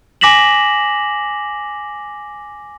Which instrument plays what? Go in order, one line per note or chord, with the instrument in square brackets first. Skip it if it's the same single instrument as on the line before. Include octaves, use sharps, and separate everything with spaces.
[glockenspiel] G#5 D6 A#6 B6 E7 F#7